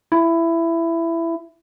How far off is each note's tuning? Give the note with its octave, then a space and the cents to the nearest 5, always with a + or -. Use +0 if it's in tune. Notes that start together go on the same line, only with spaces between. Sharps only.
E4 +15